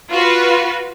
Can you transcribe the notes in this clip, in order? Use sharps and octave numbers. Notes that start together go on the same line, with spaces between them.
F4 F#4 B4